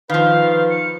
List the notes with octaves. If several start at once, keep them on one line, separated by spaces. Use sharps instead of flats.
D#3 F3 B4 F5
C#7